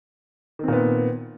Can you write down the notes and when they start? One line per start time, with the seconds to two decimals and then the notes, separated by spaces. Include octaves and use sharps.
0.59 D#3
0.64 C4
0.68 A#2
0.73 B3